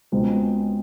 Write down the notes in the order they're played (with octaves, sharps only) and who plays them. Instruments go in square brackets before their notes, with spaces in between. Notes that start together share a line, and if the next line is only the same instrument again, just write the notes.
[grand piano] C#2 B2 G#3 C4